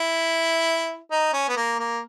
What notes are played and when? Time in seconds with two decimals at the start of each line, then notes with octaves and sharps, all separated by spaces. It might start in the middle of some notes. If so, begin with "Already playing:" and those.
Already playing: E4
1.11 D#4
1.33 C#4
1.48 B3
1.56 A#3
1.79 A#3